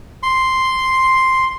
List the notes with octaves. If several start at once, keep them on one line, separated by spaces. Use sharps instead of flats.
C6